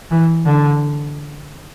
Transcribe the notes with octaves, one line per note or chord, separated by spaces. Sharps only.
E3
D3